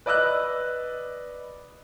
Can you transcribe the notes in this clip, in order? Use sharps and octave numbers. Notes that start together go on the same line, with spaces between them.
B4 D5 D#5 E6 F#6